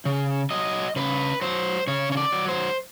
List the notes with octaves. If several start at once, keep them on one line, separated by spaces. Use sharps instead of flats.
C#3
F#3 D#5
C#3 B4
F#3 C5
C#3 C#5
C#5
D5
F#3
C5